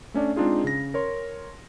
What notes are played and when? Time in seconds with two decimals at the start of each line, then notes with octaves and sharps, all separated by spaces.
0.14 A3 C#4 D4 D5
0.36 G#3 C4 D4 D#4 F4 G#4
0.64 C#3 A#6
0.94 A#4 C#5 C6